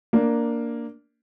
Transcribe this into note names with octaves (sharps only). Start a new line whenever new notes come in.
A#3 D4